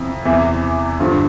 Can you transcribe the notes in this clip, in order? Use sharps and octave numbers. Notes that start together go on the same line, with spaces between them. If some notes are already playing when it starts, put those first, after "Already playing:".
Already playing: F2 C3 E3
E2 C3 E3
G2 D3 F3 F4